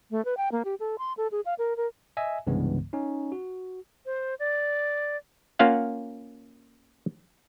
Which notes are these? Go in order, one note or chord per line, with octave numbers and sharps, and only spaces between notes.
A3
B4
G5
A#3
G4
A4
C6
A4
G#4
F5
A#4
A#4
D#5 E5 G#5
C2 G2 C#3 E3 G#3 B3
C#4 D#4
F#4
C5
D5
A#3 C#4 F4 F5 F#5